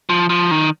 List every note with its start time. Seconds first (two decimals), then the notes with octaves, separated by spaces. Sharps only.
0.10 F3
0.29 F3
0.51 D#3